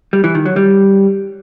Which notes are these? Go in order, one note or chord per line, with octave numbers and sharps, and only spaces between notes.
G3
E3
D#3
F#3
G3